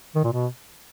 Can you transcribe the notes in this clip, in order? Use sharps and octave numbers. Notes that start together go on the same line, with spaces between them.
D#3
A#2
B2